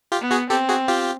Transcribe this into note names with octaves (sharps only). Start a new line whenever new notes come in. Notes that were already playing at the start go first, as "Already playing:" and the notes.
F4 G4
B3
F#4 G#4
C4 G4 A4
F#4 G#4
F4 G4